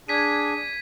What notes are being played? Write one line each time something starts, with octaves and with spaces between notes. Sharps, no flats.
D4 G#4 G#6 B6 D#7